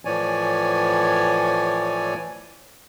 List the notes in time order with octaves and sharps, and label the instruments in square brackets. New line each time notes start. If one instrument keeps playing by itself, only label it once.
[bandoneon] A2 E3 F3 C#5 D5 G#5